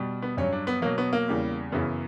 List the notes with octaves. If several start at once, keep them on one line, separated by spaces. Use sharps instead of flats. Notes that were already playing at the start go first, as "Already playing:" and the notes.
Already playing: B2 G3
B3
G2 F#3 C#4
D4
B3
B2 F#3 A#3
B3
A#3
E2 C#3 G3
F#2 C#3 E3 B3